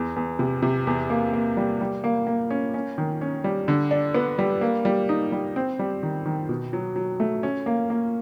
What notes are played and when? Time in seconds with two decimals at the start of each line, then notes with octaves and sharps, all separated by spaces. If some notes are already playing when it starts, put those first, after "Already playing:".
Already playing: E2
0.16 E2
0.39 C3
0.62 C3
0.87 E2
1.10 A#3
1.33 A#3
1.57 G3
1.81 G3
2.04 A#3
2.27 A#3
2.50 C#4
2.74 C#4
2.98 D#3
3.21 C#4
3.44 G3
3.68 D3
3.91 D4
4.14 B3
4.39 G3
4.61 A#3
4.85 G3
5.09 D#4
5.32 G3
5.56 C4
5.79 G3
6.03 D#3
6.26 D#3
6.49 B2
6.73 F#3
6.96 F#3
7.20 A3
7.43 C#4
7.66 A#3
7.90 A#3